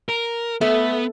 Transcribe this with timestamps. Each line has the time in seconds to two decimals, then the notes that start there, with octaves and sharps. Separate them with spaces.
0.09 A#4
0.61 A3 B3